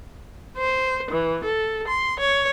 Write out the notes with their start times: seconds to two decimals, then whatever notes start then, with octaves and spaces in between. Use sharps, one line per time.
0.58 C5
1.11 E3
1.44 A4
1.88 C6
2.20 C#5